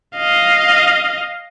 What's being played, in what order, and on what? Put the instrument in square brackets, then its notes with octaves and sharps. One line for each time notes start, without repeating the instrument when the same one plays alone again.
[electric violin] D#5 F5